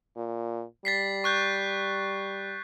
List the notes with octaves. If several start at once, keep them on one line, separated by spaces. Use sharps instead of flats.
A#2
G3 A6 B6 C7
C#6 F#6 G6